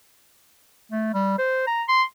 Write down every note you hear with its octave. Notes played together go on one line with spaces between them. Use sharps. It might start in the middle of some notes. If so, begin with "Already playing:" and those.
A3
G3
C5
A#5
C6